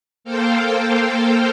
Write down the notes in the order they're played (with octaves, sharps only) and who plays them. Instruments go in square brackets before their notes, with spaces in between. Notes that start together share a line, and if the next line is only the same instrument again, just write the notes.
[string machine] A#3 A4 C5 F5 G5